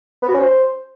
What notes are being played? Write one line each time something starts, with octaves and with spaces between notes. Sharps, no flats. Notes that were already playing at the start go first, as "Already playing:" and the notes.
B3
F#4
C#4
C5